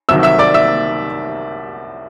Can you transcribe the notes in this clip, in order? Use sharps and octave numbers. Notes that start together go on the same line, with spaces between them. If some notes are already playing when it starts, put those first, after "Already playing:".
C2 C3 D#3 F#3 E5 E6
E5 E6
D5 D6
E5 E6